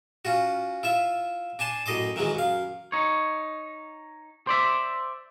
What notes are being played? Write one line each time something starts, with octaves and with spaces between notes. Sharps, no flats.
C#4 F4 F#4
E4 F4 E5
D4 G#5 A5 C6
F#2 A2 D#5 C6 D6
D#3 E3 F#3 G#3
F#2 F5
D#4 C#5
C5 D5 E5